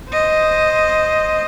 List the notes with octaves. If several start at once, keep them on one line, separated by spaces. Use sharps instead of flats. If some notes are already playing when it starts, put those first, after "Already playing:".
C5 D#5